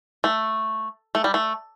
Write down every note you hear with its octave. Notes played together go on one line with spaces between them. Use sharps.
A3
A3
G3
A3